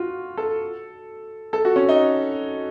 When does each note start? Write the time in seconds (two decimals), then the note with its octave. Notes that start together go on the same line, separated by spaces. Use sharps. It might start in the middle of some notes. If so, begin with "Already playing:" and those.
Already playing: F4 F#4
0.37 A4
1.53 A4
1.65 F#4
1.76 C#4
1.89 D#4